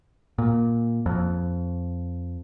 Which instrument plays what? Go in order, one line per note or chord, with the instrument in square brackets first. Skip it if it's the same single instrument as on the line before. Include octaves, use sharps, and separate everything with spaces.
[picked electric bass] A#2
F2